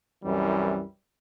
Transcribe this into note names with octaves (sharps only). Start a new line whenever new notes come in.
C2 F#2 E3 G3